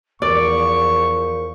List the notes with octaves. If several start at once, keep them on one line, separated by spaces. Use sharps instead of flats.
E2 F3 A#4 D5 C#6